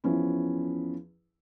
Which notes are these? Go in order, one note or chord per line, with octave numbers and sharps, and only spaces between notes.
E2 F3 C#4 E4